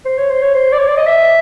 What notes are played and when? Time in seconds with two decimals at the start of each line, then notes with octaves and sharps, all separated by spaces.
0.05 C5
0.17 C#5
0.30 C5
0.42 C#5
0.54 C5
0.72 D5
0.79 C#5
0.88 D5
0.97 D#5
1.06 E5